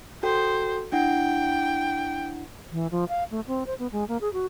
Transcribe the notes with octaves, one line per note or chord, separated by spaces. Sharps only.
F#4 A4 C5 G5
D4 E4 F#5 G5
E3
F3
F5
A3
C4
C5
B3
G#3
A#3
G#4
F#4